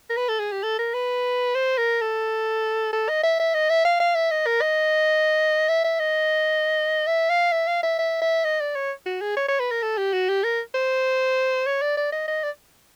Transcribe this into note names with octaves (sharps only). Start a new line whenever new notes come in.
A#4
B4
A4
G#4
G4
A4
A#4
B4
C5
A#4
A4
A4
D#5
E5
E5
D#5
E5
F5
F5
E5
D#5
A#4
D#5
E5
E5
D#5
E5
F5
E5
F5
E5
E5
E5
D#5
D5
C#5
F#4
G#4
C#5
C#5
B4
A#4
A4
G4
F#4
G4
A#4
C5
C#5
D5
D5
D#5
D#5
D5